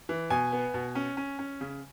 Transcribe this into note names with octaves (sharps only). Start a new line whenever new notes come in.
E3
B2 G#5
B3
B2
C#4
C#4
C#4
C#3